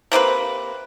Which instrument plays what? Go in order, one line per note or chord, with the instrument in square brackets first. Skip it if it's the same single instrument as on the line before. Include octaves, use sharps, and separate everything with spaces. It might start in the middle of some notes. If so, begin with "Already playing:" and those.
[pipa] C3 A#3 C4 B4